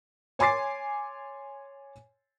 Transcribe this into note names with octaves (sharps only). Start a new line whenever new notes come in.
C#5 G#5 C6 D6 A6 C7